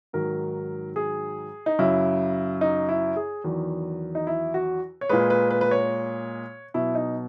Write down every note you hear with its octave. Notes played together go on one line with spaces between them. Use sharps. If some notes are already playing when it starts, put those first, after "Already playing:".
G#2 D#3 F#3 A#4
G#4
D#4
F#2 C#3 F#3 E4
D#4
E4
G#4
E2 D#3 F#3
D#4
E4
F#4
C#5
A#2 G#3 B4
B4
B4
B4
C#5
B2 F#3 E4
D#4